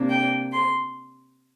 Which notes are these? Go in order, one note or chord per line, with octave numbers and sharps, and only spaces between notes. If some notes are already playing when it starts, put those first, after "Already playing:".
Already playing: C3 A#3 D4
G5
C6